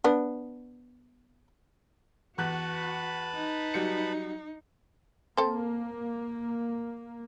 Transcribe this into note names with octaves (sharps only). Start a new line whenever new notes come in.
B3 D4
E2 F#4 B4 A5 B5 F#6
D#4
F#3 G3 C#7
A#3 C4 A4 C5